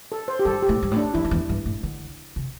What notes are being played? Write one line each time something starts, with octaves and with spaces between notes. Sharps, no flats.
A4
C5
G4
G2 A4
G4
A2
G2
A2
D4
E2 E4
G2
E2
G2
A2
D3
C3